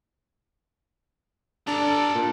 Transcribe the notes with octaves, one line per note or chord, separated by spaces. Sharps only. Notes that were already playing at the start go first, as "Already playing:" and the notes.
D4 A4 A#5
A#2